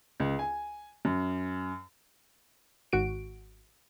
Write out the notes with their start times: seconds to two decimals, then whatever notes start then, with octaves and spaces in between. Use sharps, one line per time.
0.20 C#2
0.39 G#5
1.05 F#2
2.93 G#1 F#4 D7